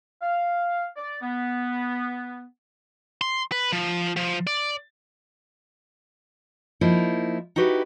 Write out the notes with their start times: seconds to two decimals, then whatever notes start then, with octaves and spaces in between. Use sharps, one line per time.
0.22 F5
0.97 D5
1.22 B3
3.21 C6
3.52 B4
3.73 F3
4.17 F3
4.47 D5
6.81 F3 A#3 D#4 E4
7.56 D#4 E4 F#4 G4 B4